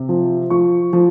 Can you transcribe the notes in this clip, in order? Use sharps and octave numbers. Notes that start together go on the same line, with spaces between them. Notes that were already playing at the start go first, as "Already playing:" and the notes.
Already playing: C3
F3
F3 C#6
F3